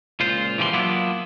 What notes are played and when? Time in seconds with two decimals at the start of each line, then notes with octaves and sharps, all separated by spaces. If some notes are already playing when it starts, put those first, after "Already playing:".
0.20 C#2 A#2 F4 C5
0.58 E3 F3 G3 A#4 C6
0.73 F#3 A#3 B3 D4 E4 F4